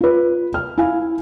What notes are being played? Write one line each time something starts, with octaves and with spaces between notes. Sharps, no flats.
F4 B4
F6
E4 F5 G#5